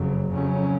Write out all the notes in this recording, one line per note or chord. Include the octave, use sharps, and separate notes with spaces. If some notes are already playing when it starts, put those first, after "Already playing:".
Already playing: F#1 F2 C#3 F#3
F2 C#3 F#3 C#4